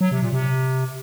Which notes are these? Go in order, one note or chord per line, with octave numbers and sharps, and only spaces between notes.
F#3
C3
A#2
C3